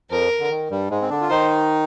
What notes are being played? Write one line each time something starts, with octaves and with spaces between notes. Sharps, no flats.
F2 F3 A#4
D3
D#3
G2 G3
G#2 G#3
C4
D3 D4
F4
D#3 D#4 C5